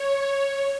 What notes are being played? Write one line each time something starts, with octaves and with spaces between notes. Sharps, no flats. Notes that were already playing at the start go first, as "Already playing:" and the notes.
Already playing: C#5